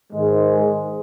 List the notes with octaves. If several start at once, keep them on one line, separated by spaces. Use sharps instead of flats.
G#2 D#3 G#3